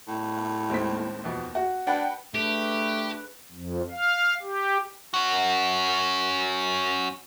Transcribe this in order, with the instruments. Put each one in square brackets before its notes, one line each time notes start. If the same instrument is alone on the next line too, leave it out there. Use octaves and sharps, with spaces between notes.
[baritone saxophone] A2
[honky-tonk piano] D#2 [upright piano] G#3 C4 B6
[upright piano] F2 B2 B3
F#4
[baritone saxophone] D4 [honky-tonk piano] B4 F#5 G5
[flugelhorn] A3 [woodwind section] D4 G#4 B4 [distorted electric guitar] G4
[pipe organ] F2
F5
G4
[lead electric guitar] C#4 F#4